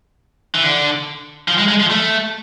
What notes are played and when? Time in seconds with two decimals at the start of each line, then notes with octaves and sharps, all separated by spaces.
0.55 E3
0.63 D3
1.48 F3
1.58 G#3
1.69 G#3
1.80 F3
1.90 A3